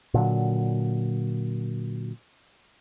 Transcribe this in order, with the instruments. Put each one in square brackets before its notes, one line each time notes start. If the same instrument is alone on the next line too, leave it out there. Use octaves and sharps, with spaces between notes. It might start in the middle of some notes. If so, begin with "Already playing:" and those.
[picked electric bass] A#2 D3 F#3